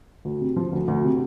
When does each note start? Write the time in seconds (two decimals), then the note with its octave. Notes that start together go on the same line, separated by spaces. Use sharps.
0.25 D2
0.41 C3
0.56 F3
0.73 D2
0.88 D2
1.04 C3